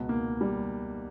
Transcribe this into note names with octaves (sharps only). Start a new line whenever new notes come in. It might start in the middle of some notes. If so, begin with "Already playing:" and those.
Already playing: C#2 B2
A#3
G3